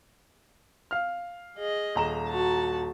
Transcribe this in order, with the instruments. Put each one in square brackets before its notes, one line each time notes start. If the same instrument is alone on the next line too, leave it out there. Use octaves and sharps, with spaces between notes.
[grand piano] F5 F6
[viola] G#4 D#5
[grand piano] D#1 A#5 E7
[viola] F#4 A5